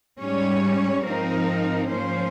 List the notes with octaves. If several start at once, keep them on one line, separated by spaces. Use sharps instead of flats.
G#2 G3 C#4 C#5
G#2 F3 C4 D#4 A#4
G#2 F3 A#3 C#4 C5